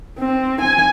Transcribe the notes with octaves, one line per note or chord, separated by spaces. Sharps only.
C4
G#5